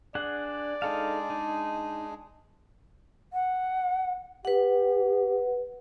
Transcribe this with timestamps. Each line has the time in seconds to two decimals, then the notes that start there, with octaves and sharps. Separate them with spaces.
0.15 D4 G#4 D5 F#5
0.82 G#3 D4 D#4 G#4 A4 F5
1.30 D#4
3.33 F#5
4.45 G4 B4 F#5